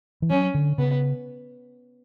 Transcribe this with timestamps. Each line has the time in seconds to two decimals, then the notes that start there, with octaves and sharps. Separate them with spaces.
0.22 E3
0.30 F#3 C#4
0.54 D3
0.78 C#3 B3